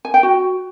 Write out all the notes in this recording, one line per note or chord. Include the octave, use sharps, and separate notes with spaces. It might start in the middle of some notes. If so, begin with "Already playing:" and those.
G#5
G5
F#4